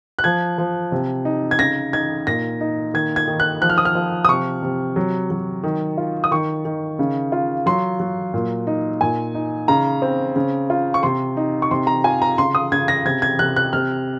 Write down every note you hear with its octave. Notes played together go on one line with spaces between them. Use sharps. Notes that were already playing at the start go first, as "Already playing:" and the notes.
F#6
F3 G#6
F3
C3
D#4
G#6
C#3 A#6
D#4 G#6
A#2 A#6
D#4
D#3 G#6
G#6
D#3
F#6
F3 F#6
F6
D#6
F6
F3
D#6
C3 C#6
C3
F#3
F#3
D#3
F4
D#6
D#3 C#6
D#3
C#3
F4
F#3 C6
F#3
A#2
D#4
A#2 G#5
D#4
C#3 A#5
C4
C#3
F4
C#6
C3 C6
D#4
C#6
C3 C6
A#5
F4 G#5
A#5
C#3 C6
D#6
C#3 G#6
A#6
C3 G#6
G#6
C3 F#6
F#6
C3 F6